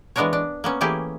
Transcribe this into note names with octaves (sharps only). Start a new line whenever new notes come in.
E3 G#3 B3 D4 A#4 C#5
D4
A#3 B3 C#4
E3 A3 A#3 E4 G4 G#4